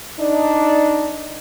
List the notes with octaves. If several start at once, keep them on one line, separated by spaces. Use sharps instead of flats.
D4 D#4